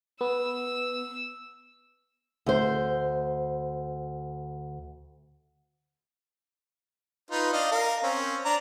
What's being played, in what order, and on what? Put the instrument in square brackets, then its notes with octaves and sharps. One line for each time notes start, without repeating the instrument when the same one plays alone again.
[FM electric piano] B3 [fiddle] E6
[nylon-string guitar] D2 C5
[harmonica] D#4 F4 B4
D4 D#5 F5
A#4 F5
C4 C#4
D4 A#5